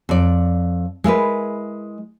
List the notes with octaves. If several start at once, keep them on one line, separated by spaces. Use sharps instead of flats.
F2 D5
G#3 E4 A#4 B4